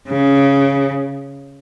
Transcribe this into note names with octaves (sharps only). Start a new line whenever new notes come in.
C#3